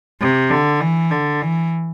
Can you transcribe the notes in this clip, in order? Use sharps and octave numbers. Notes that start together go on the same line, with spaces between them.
C3
D3
E3
D3
E3